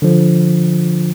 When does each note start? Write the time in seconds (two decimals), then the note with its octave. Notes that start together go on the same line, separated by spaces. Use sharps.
0.02 D3 F3